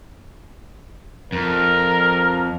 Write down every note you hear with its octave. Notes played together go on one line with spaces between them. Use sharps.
F2 A#4